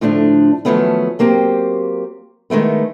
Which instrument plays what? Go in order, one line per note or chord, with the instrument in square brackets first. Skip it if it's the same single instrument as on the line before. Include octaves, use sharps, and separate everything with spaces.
[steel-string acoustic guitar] A2 D3 F3 A3 D4
D#3 F3 F#3 A3 B3 C#4
F#3 A#3 C4 G4
D#3 G#3 A3 B3